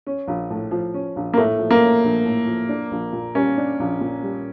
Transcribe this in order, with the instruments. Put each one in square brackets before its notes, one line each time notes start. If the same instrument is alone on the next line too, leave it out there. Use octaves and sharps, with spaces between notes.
[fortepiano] C#4
A#1
A2
F3
C#4
A#1
[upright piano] A#3
[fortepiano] A2 [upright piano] A3
[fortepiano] F3
[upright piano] A#3
[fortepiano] C#4
A#1
A2
F3
D4
A#1
A#2
[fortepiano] G3 [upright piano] C#4
[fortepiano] D4
A#1
A#2
G3